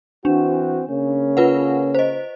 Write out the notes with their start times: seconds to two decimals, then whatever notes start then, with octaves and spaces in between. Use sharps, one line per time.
0.25 E3 C4 D4 F#4
0.88 C#3 A#3 C#4
1.37 F4 B4 F#5
1.95 C5 D#5